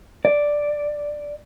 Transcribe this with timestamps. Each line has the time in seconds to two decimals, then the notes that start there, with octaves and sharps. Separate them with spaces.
0.25 D5